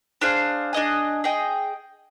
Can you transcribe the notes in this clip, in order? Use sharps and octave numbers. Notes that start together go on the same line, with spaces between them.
D4 G#4 C5 F5
D4 G#4 D#5 G#5
G#4 D#5 G5